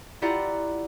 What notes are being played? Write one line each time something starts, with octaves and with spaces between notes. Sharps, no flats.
E4 F4 G4 D5 F#5 A#5